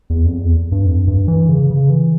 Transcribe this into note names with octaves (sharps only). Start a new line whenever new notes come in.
E2
F2
E2
G2
F2
G2
E3
C#3
C#3
E3